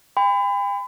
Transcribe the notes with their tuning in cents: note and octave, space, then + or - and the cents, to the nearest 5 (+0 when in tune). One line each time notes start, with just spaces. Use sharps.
G5 +40 B5 +35